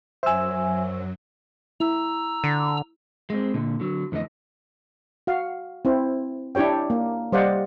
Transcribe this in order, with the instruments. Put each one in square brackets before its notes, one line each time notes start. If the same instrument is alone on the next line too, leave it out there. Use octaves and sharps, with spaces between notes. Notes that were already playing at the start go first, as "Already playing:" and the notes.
[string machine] F#2 F#3 [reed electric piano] C5 E6 [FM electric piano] E5 G#5
[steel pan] E4 [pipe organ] A#5 E6
[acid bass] D3
[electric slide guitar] G#3 A3 C4
A#2 D3
D3 F#3
F2 D3 E3 A3 D#5
[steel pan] F#4 F5
C4 E4 C5
D4 E4 G4 C#5 G5
A#3
G3 C5 D5 D#5 F5 F#5